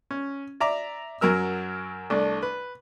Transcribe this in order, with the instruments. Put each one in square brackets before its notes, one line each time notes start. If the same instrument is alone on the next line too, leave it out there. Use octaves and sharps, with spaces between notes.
[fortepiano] C#4
D5 E5 A#5 D6
F#2 F#3 A#4 E6
C2 A3 D4
B4